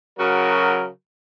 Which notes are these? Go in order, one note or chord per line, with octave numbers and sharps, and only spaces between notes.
C#3 F#3 F#4 A#4